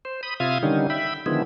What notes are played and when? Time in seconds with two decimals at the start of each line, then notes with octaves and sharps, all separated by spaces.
0.05 C5
0.23 B5 D#6
0.40 C3 F4 E5 F5 D#6 G#6
0.63 D3 D#3 G3 C#4 D#4
0.90 E5 G5 B5
1.26 D3 D#3 F3 G#3 B3 E4